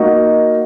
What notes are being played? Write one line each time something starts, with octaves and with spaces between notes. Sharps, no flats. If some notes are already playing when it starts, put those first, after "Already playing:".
Already playing: A#3 D#4 F#4